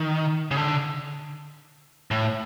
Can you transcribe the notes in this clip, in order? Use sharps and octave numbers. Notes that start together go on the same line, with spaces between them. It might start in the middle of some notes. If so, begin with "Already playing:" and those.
Already playing: D#3
C#3
D3
A2